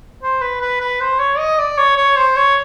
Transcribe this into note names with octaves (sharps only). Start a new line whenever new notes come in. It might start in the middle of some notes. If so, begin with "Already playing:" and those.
C5
B4
B4
B4
C5
C#5
D#5
D5
C#5
C#5
C5
C#5